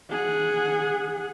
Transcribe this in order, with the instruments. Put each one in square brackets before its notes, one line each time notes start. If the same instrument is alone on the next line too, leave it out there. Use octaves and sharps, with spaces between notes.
[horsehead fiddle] G#4 F#5